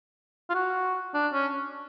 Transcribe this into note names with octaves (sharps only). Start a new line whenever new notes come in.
F4
F#4
D4
C#4